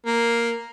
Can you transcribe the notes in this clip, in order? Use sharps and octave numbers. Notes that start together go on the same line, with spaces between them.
A#3